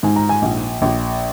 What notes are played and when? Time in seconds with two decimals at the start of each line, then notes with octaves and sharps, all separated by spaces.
0.03 G#2 G#5
0.16 A#5
0.29 G#5
0.42 A#1
0.82 A#1